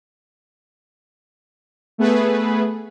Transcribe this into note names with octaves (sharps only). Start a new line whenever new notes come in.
A3 B3 G#4 B4